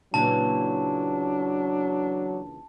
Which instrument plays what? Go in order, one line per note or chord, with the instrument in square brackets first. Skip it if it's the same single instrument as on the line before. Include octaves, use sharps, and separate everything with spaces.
[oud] A#2 C#3 E3 [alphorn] F#3 [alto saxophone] D4 [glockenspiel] A5